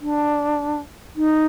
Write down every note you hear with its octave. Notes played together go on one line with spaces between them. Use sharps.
D4
D#4